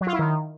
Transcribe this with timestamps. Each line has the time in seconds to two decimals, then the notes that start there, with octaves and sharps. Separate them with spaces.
0.01 F#3
0.07 F4
0.13 E4
0.19 D#3